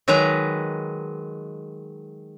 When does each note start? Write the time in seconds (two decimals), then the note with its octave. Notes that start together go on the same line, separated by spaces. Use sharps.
0.08 D#3 F#3 G#3 B4 A#5